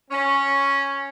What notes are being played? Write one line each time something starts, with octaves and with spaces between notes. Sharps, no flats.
C#4